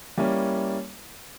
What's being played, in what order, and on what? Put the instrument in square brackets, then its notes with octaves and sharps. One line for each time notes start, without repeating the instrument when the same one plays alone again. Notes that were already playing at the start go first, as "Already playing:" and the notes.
[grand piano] G3 A#3 C#4 E4